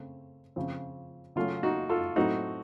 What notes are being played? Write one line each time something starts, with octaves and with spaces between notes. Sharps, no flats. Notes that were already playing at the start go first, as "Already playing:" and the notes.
Already playing: C#3 A3 C4
C#3 F3 C4
C#3 F#3 A3 C#4 F4
D#4 F#4
F4 A4
A2 F#3 A3 C4 D#4 F#4